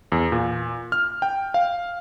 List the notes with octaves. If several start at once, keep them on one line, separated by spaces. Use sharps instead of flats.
E2
A#2
F6
G5
F5